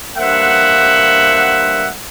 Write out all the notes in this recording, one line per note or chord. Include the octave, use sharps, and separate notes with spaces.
G2 A#3 C5 E5 F#5